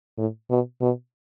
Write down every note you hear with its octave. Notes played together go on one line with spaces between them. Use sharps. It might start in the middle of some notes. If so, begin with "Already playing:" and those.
A2
B2
B2